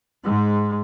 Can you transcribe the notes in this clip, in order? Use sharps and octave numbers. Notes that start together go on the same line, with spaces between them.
G#2 G#3